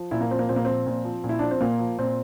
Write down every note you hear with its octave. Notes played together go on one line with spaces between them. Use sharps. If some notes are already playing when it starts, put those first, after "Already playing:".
Already playing: F3
A#2 E4
A#3
F3 C4
A#3
A#2 C4
A#3
F3 C4
A#2
F3
A#2
E4
F3 D4
C4
A#2 A#3
F3
A#2 C4